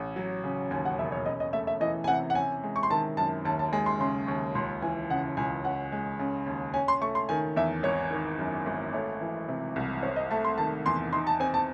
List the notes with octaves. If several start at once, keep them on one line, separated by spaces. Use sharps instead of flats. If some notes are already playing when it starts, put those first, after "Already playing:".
Already playing: A1
F#3
C#3
D#2 G#5
F#5
E1 E5
C#5
C#4 D#5
D#5
A3 E5
E5
E3 D#5
G#5
C3 F#5
F#5
C#4 G#5
G#3
C#6
C6
D#3 A5
F#2 A5
D#2 A5
A5
G#3 G#5
C6
C#3 C6
D#2 C#6
C#2 C6
E3 G#5
C#3 F#5
C#2 G#5
C#4 F#5
G#3
C#3
D#2
C#4 G#5
C6
A3 C#6
C6
D#3 G#5
E2 E5
G#1 C#5
D#3
F#2
G#1
A3 C#5
E3
C3
C2
C4 C#5
D#5
A3 A5
C6
D#3 A5
E2 C6
D#4 C6
A5
C4 G#5
A5